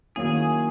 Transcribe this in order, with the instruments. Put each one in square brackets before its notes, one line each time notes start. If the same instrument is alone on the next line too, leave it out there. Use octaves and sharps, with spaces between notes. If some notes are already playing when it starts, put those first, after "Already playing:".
[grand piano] D#3 F#3 A#3 C#4 E4 [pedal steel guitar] G#4